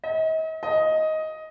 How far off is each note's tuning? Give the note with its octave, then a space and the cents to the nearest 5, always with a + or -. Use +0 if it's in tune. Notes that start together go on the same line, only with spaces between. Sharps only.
D#5 +40
D#5 +10